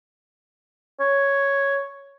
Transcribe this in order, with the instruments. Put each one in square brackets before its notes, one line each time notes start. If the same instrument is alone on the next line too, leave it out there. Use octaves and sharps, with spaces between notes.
[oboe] C#5